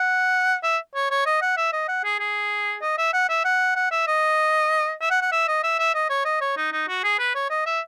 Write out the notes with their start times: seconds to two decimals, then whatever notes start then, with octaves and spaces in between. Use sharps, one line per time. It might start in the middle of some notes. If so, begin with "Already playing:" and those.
Already playing: F#5
0.63 E5
0.95 C#5
1.11 C#5
1.26 D#5
1.42 F#5
1.57 E5
1.73 D#5
1.88 F#5
2.04 G#4
2.20 G#4
2.82 D#5
2.98 E5
3.13 F#5
3.29 E5
3.45 F#5
3.76 F#5
3.91 E5
4.07 D#5
5.01 E5
5.11 F#5
5.21 F#5
5.32 E5
5.48 D#5
5.63 E5
5.79 E5
5.95 D#5
6.10 C#5
6.25 D#5
6.41 C#5
6.57 D#4
6.72 D#4
6.88 F#4
7.04 G#4
7.19 B4
7.35 C#5
7.50 D#5
7.66 E5